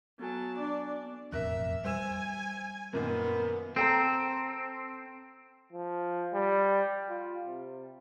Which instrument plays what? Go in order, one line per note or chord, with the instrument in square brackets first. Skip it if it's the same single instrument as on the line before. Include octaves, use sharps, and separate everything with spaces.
[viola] F#3 A5 [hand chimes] B3 A4 G#5
[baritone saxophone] D4 [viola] D5
[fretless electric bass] E1 A1 F2 [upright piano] A#4 F#6 [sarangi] E5
[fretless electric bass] G3 [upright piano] C5 E6 E7 [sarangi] G#5
[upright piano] F#2 A#2 D#3 [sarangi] B3 [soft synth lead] A#4
[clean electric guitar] C4 [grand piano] A4 G5 A#5
[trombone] F3
G3
F4
C3